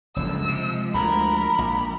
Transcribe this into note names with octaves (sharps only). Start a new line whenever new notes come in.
F#1 D2 F3 G#3 E6
C3
D2 A#4 B5
A#1